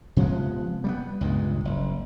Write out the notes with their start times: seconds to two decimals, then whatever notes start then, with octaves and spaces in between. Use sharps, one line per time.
0.17 C3 F3 G#3 B3
0.84 G3 A3 B3
1.21 C#2 G2 A#2 G#3
1.65 F#1